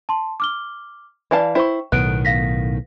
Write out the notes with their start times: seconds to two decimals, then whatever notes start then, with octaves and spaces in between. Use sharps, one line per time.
0.09 A5 C6
0.40 D6 F6 G7
1.31 E3 B4 D5 F5 A5
1.55 E4 C5 G5 C#6
1.92 B1 A2 D#3 B3 F#6 D7
2.25 F5 A#6 B6